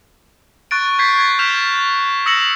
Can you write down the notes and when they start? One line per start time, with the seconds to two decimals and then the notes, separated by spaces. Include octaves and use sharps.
0.71 C#6 F#6 A6 D7
0.99 C#6 G6 G#6 B6 C7
1.18 G#6 A6
1.39 F6 G6 B6 E7 F7
2.26 D#6 E6 A#6 C#7 E7 F#7